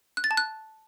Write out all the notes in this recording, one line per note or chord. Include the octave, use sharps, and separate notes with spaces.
F#6
A6
A5
F#6